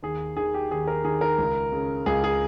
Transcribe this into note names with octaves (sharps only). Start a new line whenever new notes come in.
D#2 G#4
D#3 G#4
G4
D#2 G#4
A#4
D#3 G#4
A#4
C#2
C#3
C#2 G#4
G#4